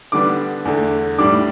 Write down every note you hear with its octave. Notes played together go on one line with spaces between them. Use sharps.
D3 G3 B3 D4 D6
E2 D3 A3
A2 G3 D4 D6